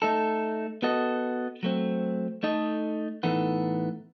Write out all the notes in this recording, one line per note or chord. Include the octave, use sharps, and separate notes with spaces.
A3 D#4 A4
B3 F#4 A4 D#5
F#3 A3 C4
A3 D#4 A4 D#5
A2 E3 B3 D#4 A4